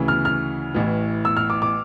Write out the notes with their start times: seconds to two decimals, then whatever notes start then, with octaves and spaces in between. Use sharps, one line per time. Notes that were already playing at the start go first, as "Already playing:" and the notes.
Already playing: D2 C#3 E3
0.08 F6
0.25 F6
0.74 A1 A2 E3
1.25 E6
1.37 F6
1.50 D6
1.62 D6